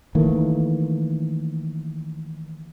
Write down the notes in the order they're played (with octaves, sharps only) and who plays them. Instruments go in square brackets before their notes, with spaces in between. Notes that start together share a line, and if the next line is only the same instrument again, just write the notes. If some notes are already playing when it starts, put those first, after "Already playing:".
[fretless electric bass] D#3 E3 A3 A#3